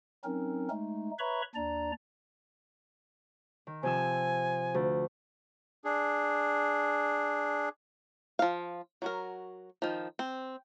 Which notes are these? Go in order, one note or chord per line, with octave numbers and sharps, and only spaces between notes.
F#3 C4 C#4 D#4 A#4
G#3 A3 D#4
B4 C#5 E5 A#5 B5 C#6
D#2 D4 D5 A#5
D#3
C3 F3 G#5 E6
D2
D4 G#4
F3 F5
F#3 F#4 A#4
D#3 F3
C4